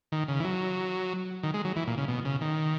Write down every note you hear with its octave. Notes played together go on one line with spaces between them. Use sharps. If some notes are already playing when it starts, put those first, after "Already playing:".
D#3
C#3
E3
F#3
D#3
G#3
F#3
E3
A#2
C#3
B2
C#3
D#3